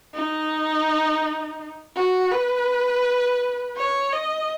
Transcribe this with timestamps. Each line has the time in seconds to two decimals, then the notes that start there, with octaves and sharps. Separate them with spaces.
0.14 D#4
1.96 F#4
2.32 B4
3.77 C#5
4.12 D#5